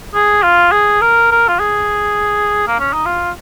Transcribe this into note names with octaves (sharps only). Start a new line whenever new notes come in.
G#4
F4
G#4
A#4
A#4
F4
G#4
A#3
C#4
D#4
F4